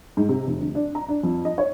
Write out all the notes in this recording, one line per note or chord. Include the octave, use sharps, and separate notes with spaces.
G#2
C3
F1
D2
D4
A#5
D4
F2
D#5
C#5